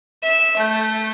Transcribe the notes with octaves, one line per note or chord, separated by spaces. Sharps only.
E5 E7
A3 G6